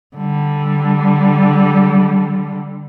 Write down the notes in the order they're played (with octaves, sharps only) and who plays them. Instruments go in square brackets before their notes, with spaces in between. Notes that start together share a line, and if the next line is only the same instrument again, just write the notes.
[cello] D3 G3